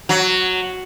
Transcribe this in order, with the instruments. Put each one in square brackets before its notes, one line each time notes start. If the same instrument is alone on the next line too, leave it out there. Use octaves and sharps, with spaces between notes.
[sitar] F#3